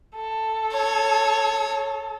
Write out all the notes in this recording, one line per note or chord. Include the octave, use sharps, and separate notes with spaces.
A4
C#5